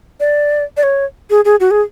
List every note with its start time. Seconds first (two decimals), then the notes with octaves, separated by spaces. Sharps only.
0.20 D5
0.77 D5
0.83 C#5
1.30 G#4
1.45 G#4
1.60 F#4
1.71 G#4